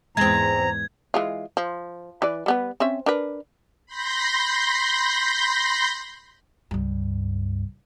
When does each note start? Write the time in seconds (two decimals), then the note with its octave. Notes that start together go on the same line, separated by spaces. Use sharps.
0.17 E2 G#2 G#3 C4 A#5 G#6
1.14 E3 G#3 F4
1.57 F3
2.22 E3 B4 D5
2.46 G3 B3 B4
2.80 C4 C#4 E5
3.06 D4 A#4 B4
3.86 B5 C6 G6 A#6
6.71 C#2 G2